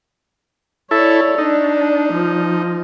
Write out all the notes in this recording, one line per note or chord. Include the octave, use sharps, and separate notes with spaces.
E4 A4 C#5 D5
D4 D#4
F3